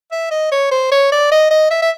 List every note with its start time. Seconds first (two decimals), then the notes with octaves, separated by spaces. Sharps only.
0.12 E5
0.32 D#5
0.52 C#5
0.72 C5
0.92 C#5
1.12 D5
1.32 D#5
1.51 D#5
1.71 E5
1.82 E5